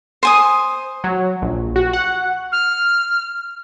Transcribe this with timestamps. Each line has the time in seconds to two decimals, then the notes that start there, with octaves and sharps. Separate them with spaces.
0.23 C5 G#5 D#6
1.04 F#3
1.42 A#1
1.76 F#4
1.93 F#5
2.52 F6